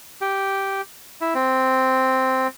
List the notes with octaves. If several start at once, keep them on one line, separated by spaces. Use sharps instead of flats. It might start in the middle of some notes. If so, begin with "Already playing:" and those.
G4
E4
C4